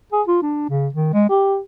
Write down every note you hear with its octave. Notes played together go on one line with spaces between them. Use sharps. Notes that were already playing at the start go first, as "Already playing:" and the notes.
G#4
F4
D4
C#3
D#3
G#3
G4